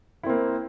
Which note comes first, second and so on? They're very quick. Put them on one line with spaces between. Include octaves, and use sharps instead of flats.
E4 C4 A#3